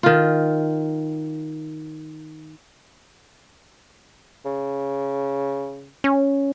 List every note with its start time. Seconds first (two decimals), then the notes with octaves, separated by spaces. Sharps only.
0.03 D#3 F4
4.46 C#3
6.04 C#4